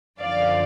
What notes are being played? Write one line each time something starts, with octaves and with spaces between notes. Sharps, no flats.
F#2 D3 F3 D5 F5